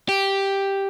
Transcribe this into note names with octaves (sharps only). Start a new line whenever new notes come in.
G4